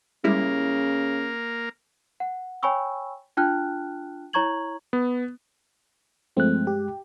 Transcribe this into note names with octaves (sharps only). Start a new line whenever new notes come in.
C#3 G3 G#3 A#3 E4 A#4
F#5
C#5 G5 G#5 B5 C#6 E6
D4 F4 G5 A5 F6 F#6
E4 C#5 A#5 C#6 G#6 F#7
B3
G2 F3 G#3 A3 C4 F#6
G4